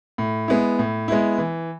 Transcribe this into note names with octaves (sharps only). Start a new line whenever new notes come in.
A2
G#3 B3 E4
A2
G#3 B3 E4
E3